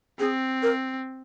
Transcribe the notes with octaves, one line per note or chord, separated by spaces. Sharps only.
C4 G#4
A#4